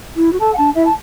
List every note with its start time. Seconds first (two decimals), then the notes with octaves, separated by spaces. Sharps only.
0.16 E4
0.33 F#4
0.40 A4 A5
0.53 F#5
0.57 D4 A5
0.75 E4 E5
0.86 A5